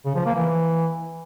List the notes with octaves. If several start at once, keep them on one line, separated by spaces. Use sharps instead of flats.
C#3
F3
A#3
E3